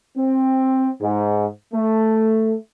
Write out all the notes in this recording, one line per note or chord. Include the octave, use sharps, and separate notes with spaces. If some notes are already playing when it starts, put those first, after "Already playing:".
C4
G#2
A3